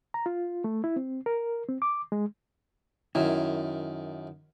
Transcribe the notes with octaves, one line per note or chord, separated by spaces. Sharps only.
A#5
F4
A3
E4
C4
A#4
C4
D6
G#3
F#2 D#3 E4